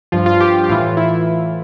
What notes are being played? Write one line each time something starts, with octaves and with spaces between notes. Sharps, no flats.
G2 F3 F4
F4
G4
G4
A2 E3 F4
E4